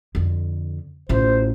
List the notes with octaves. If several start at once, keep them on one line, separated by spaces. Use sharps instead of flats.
F2 D3
A1 F4 C5